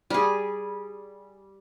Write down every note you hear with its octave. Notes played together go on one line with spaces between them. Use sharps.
G3 G#4